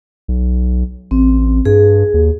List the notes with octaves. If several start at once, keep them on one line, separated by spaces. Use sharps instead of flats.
B1
A1 C4
G2 G#4
D#2